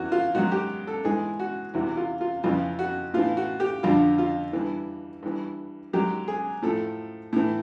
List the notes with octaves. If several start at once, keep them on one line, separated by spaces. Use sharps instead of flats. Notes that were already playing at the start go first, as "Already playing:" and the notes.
Already playing: E2 F#4
F4
G#2 D#3 F#3 F#4
G4
A4
G#2 E3 G#4
F#4
E2 C3 E3 F#4
F4
F4
F2 C#3 E3 F4
F#4
A2 E3 F4
F#4
G4
F2 D3 F3 F4
F4
G2 E3
G2 E3
G#2 D#3 F#3 G4
G#4
A2 F3 A4
A2 E3